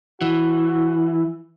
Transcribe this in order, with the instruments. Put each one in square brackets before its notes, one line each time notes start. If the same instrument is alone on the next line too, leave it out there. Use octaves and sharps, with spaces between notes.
[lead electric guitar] E3 [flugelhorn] F#4